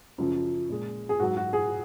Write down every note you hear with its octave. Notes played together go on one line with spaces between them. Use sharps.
F#2 C#3 F3
A#2 G#3
G#4
G#2 F#3 F#4
F#4
G#4